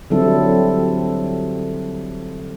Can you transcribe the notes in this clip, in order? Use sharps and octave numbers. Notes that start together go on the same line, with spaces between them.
D3 F#3 G3 C4 E4 A4